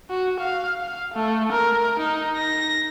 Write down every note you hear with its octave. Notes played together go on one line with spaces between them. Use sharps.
F#4
F5
F5
A3
A#4
D#4
A#6